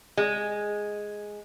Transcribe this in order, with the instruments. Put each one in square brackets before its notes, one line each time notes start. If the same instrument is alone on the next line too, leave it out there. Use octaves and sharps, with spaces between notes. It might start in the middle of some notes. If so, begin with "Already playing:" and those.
[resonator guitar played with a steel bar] G#3